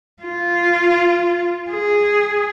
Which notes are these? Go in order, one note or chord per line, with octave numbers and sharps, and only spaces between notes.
F4
G#4